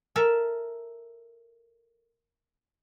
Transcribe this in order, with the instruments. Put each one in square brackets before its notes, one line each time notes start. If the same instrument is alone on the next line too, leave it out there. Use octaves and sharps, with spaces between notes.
[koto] A4 A#4 E5